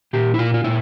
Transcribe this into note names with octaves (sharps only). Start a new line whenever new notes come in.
A#2 G4
E4
A#2 F4
F4
A#2 E4